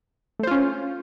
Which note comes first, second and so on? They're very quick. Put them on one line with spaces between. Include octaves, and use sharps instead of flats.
A3 C5 F4 C#4